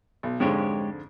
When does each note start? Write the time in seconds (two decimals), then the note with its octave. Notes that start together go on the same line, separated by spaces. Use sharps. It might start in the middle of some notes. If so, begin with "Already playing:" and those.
0.23 B1
0.40 F2 G#2 D3 G#3 G4 C#5